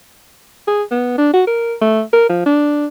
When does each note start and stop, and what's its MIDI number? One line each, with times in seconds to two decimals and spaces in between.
0.68 0.83 68
0.91 1.14 59
1.18 1.30 62
1.34 1.43 66
1.47 1.74 70
1.81 2.02 57
2.13 2.29 70
2.29 2.41 53
2.46 2.86 62